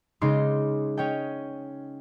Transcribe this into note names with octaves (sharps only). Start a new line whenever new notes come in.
C#3 G#3 D#4 C6 D6 A#6
C#4 C#5 D#5 G5